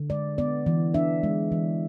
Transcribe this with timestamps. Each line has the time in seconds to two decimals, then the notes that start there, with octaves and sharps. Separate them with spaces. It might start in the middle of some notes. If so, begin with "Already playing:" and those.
Already playing: D3
0.10 G#3 D5
0.38 B3 D5
0.66 E3
0.94 D4 E5
1.23 G#3
1.52 E3